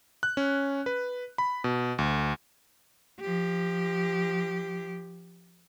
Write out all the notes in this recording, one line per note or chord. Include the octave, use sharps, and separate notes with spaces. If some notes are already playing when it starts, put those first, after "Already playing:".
F#6
C#4
B4
B5
B2
D2
F3 G4